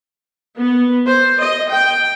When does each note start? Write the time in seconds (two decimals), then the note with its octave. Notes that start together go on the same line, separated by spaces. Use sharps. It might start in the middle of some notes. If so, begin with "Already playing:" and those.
0.58 B3
1.07 C5
1.41 D#5
1.72 G5